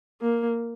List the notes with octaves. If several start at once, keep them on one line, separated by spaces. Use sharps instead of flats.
A#3